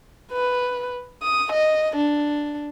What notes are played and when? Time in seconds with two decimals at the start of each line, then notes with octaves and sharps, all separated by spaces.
0.32 B4
1.22 D#6
1.52 D#5
1.96 D4